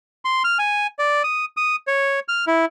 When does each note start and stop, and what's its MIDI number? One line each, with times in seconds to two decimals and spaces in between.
0.25 0.43 84
0.44 0.58 89
0.59 0.87 80
0.99 1.23 74
1.24 1.45 87
1.57 1.76 87
1.87 2.20 73
2.28 2.45 89
2.47 2.65 64